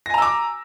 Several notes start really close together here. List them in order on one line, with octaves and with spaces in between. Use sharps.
A#6 G#5 A#5 E6 D6